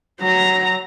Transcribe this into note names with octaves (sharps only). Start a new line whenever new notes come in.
F#3 A#5